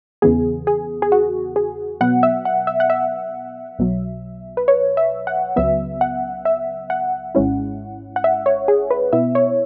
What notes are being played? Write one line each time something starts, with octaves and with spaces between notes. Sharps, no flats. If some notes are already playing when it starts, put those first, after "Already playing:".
E2 C#3 E3 B3 G#4
G#4
G#4
F#4
G#4
B2 F#3 B3 F#5
E5
F#5
E5
F#5
E5
B1 B2 F#3
B4
C#5
E5
F#5
C#2 C#3 F#3 B3 E5
F#5
E5
F#5
G#1 G#2 G#3 C#4 E4
F#5
E5
C#5
G#4
B4
B2 B3 E4 E5
C#5